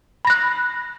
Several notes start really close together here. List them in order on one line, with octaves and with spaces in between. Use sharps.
B5 A#6 F#6